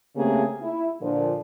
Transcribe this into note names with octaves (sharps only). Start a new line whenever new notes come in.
C#3 A3 A#3 C4 G4 G#4
E4
A#2 D3 F3